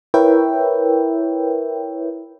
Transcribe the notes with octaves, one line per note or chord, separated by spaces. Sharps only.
E4 A#4 B4 C#5 E5 G5